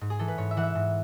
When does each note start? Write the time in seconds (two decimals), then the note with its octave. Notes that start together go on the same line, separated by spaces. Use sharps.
0.01 G#2
0.10 G#4
0.19 E3 A4
0.28 B4
0.38 G#2 C#5
0.51 E5
0.57 E3 F#5
0.63 E5
0.75 G#2